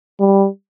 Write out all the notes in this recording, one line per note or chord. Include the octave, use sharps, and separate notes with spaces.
G3